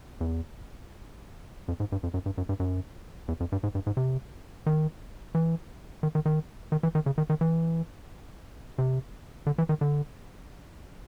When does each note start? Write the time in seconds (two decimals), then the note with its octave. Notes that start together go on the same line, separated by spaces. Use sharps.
0.21 E2
1.68 F2
1.80 G#2
1.92 G2
2.03 F2
2.14 F#2
2.26 G2
2.38 F#2
2.49 G2
2.60 F#2
3.28 E2
3.40 F2
3.52 G2
3.63 G#2
3.75 G2
3.87 G#2
3.97 C3
4.66 D#3
5.35 E3
6.03 D#3
6.15 D#3
6.26 D#3
6.72 D#3
6.83 E3
6.95 D#3
7.06 C#3
7.18 D#3
7.30 D#3
7.41 E3
8.78 C3
9.46 D3
9.58 E3
9.69 D#3
9.81 D3